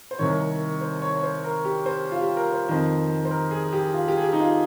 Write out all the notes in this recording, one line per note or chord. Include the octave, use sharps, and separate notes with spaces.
C5
C2 C3 D#3 C#5
C5
C#5
C#5
C5
A#4
G4
C5
F4
G4
A#4
C5
F2 D#3 C5
C5
A#4
G#4
G4
F4
G4
G#4
G4
D#4
F4